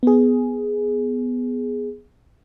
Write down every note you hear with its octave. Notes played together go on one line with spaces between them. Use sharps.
B3 G#4